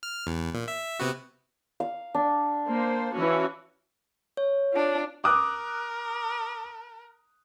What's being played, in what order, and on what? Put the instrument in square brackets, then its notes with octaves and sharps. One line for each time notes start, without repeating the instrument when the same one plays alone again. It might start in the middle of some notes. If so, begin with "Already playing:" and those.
[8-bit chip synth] F6
E2
A#2
E5
C3 B3 F#4
[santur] F5
D4
[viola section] A#3 C5
E3 C#4 F#4
[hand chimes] C#5
[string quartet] D4 F4
[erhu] A#4 [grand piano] D6 D#6 F#6